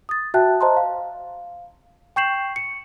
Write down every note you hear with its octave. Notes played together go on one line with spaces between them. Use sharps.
D#6 A6
F#4 E5 G5 A5 F#6
C5 D#5 A5 A#5 C6
F5
G5 C#6 G6 C7 E7 F#7
C#7